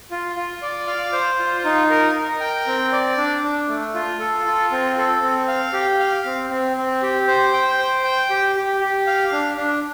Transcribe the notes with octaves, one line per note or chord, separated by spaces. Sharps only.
F4
F4
D5
F5
C5
F4
D#4
A#4
A#4
G5
C4
D5
D4
D4
A3
F4
A4
F4
C4
A4
C4
F5
G4
F5
C4
C4
C4
G4
C5
G5
C5
G5
G4
G4
G4
F5
D4
D4